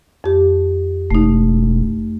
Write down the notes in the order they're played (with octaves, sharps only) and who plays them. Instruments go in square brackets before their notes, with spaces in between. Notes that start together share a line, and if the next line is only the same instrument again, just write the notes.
[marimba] F2 G4
[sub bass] E1 [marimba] A3 D#4